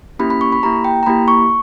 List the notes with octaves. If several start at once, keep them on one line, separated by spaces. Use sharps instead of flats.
A#3 C#4 E4 G4 B5
B5
C#6
B5
A#3 E4 G4 A#5
G5
A#5
A#3 E4 G4 B5
C#6